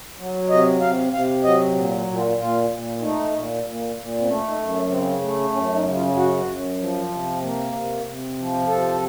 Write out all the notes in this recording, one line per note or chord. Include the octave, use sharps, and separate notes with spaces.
F#3
C3 D#5
C3 F5
C3 F5
F#3 D#5
A#2
A#2
F4
A#2 F4
A#2
A3 D#4
A#2
A#2
A#2
C4
A3 C#4
D#4
F#2
C#4
C#3 C4
A3
F#2 C#4
D#4
C#3
F4
F#2 F#4
F#2
F3
C3
A#3
C3
C3
F3
C3 A4